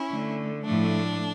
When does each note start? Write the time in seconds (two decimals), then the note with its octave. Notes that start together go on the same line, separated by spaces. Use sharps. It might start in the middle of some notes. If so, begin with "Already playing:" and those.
Already playing: C#4 E4
0.10 D3 A3
0.64 A2 F3 A3 D4